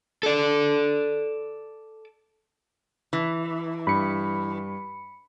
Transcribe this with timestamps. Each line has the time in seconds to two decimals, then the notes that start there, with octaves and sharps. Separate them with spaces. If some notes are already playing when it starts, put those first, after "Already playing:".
0.23 A4 D5
3.13 E3
3.87 G2 B5 C#7